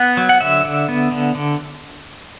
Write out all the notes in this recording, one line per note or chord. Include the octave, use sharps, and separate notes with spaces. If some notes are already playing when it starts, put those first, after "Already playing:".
Already playing: B3 F#5
F#3
F#5
D3 E5
D3
B3
D3
D3